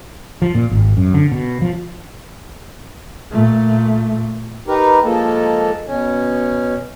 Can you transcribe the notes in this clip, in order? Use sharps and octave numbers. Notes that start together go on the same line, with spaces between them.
F3
A#2
G#1
F#2
D3
B2
F3
A#2 A3
D#4 G4 A#4 B4
F3 G#3 A#3 A4
B2 C#4